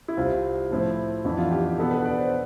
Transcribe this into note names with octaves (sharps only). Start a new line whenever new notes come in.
E4
C2 C3 G3 C4 F4
A2 F3 C4 E4
F2 E3 B3 D4 E4
F4
G4
G4
B2 B3 D4 A4
B4
D5
C5